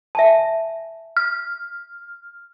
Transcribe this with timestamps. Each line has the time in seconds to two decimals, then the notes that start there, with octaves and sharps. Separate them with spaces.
0.15 E5 G#5 A5
1.17 F6